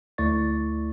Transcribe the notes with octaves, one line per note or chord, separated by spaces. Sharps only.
D2 A3 E4 D5 C#6 A6